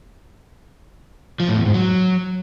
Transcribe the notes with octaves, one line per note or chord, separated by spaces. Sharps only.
F3
A2
E2
G#2
F#3